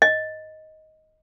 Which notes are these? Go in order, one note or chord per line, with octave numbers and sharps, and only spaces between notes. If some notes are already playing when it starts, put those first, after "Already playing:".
D#5